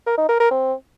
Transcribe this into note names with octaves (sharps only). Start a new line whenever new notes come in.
A#4
D#4
A#4
A#4
C4